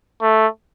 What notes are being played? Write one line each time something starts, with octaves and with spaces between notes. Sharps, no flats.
A3